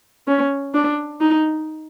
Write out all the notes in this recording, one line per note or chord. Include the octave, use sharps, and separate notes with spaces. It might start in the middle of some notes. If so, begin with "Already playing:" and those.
C#4
D4
D#4